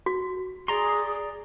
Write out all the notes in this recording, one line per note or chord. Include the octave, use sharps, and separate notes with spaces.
F#4
G#4 D5 A#5 C6